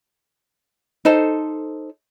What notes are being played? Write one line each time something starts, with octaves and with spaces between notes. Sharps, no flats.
D#4 A4 C5 A5